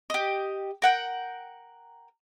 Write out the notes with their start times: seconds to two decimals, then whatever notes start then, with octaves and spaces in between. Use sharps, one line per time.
0.10 G4 D#5
0.82 A#4 F#5 G5